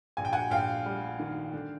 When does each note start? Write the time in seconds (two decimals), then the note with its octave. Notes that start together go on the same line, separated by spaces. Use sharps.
0.17 A#1 G#5
0.25 G5
0.33 F#5 G#5
0.51 A#1 F5 G5
0.86 G3
1.19 D#3
1.54 D3